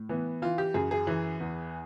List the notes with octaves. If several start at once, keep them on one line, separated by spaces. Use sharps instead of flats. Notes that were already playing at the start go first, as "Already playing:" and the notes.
Already playing: A2
E3 B3
E3 F4
G4
F#2 G#4
G#4
E3
E2